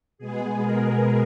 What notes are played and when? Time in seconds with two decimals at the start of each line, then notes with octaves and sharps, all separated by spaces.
0.18 B2 G#3 B3 G#4
0.61 A#4